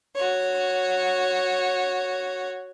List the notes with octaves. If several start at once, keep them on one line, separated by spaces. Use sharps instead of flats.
F#4 C#5